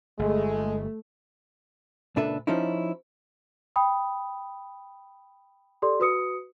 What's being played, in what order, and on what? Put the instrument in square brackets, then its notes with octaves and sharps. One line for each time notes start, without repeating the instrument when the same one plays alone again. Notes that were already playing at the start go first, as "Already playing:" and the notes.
[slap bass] G1 [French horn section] G#3 [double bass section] A3
[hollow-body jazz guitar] C#2 A#2 D4 A4 B4 E5
F3 C#4 D#4 E4
[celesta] G5 B5 D#6
G4 A4 D5 C6
F#4 B4 D#6 C#7